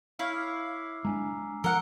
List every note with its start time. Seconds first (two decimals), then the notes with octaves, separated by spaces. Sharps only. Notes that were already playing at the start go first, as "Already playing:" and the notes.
0.19 E4 C#5 F5 E6 F6 B6
0.34 D6 E6 C7
1.05 G#3 A#3 D4 G#5 A#5
1.64 F3 A#4 F#5 E6 C#7 G7